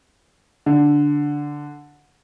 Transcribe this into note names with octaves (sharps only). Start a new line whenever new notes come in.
D3